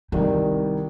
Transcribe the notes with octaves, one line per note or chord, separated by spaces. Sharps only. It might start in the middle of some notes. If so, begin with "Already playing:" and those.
C2 D#3 G3